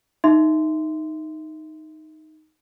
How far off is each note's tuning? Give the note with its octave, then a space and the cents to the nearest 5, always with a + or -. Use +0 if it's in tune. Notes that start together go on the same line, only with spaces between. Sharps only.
D#4 +0 E5 +0 C6 -15